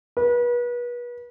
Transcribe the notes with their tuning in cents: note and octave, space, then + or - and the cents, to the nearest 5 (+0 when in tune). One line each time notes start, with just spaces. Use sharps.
B4 -35